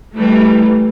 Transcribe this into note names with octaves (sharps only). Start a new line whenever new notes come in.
E3 G3 A3